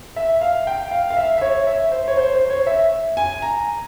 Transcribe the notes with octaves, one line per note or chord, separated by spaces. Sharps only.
E5
F5
G5
F5
F5
E5
E5
C#5
E5
C5
C#5
C5
C5
C#5
E5
G#5
A#5